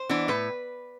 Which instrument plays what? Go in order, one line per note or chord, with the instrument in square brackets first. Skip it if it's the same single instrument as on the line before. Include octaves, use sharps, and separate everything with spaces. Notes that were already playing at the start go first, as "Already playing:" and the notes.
Already playing: [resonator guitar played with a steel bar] C5
E3 B3 D4
A2 B4